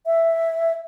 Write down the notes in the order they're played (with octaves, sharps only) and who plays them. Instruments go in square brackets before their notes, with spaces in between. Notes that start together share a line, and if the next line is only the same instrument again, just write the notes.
[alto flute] E5